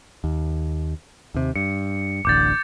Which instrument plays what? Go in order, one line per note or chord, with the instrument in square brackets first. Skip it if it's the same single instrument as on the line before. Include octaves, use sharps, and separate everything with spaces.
[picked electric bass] D#2
D#2 C3
[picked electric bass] G2 [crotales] C#7
[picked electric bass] D1 A1 D3 [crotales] D6 G6 A6